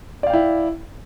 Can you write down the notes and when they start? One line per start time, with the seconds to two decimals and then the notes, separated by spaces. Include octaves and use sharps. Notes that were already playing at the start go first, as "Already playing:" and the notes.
0.23 D5
0.27 F5
0.30 G5
0.33 E4